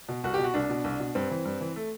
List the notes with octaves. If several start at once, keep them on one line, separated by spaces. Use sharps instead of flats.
B2
C2 F#4
G4
B2
F#4
C2 D4
B2
C2
B2
G2 C4
E3
G2
E3
A3